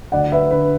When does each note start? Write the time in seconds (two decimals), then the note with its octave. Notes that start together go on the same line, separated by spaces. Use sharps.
0.12 D2 D5 F#5
0.32 B4 E5
0.51 D3 B4